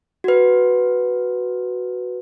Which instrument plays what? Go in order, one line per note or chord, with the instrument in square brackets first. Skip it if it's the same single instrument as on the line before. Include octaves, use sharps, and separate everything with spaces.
[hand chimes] F#4 B4